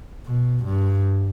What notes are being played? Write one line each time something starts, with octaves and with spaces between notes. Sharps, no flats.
B2
G2